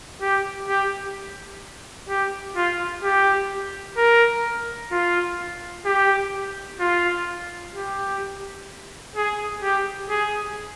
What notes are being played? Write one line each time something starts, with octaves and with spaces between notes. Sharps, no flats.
G4
G4
G4
F4
G4
A#4
F4
G4
F4
G4
G#4
G4
G#4